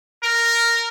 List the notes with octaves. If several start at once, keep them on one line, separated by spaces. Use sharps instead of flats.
A#4